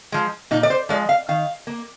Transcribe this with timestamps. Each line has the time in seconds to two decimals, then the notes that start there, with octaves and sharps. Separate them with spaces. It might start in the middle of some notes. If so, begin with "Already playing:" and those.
0.12 F3 G#3
0.51 A#2 D#4
0.63 D5
0.70 C5
0.89 F3 G#3 D5
1.09 F5
1.28 D#3 F5
1.67 A#3